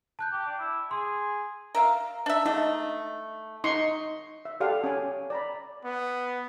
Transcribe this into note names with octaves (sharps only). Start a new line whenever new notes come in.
A5 F#6 G6
G4
D4
E4
G#4 C6
A#4 E5 F5
D4 E5
A3 D#4
D#4 C6 C#6
E5
G4 A4 D5 F5 F#5
C#4 G#5
D5 A#5 B5
B3